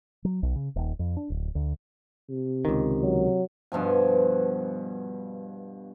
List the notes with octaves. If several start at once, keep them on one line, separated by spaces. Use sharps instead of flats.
F#3
B1
C#3
D#1
F2
D4
D1
D2
C3
C#2 D#3
F#3
G2 B2 F3 G#5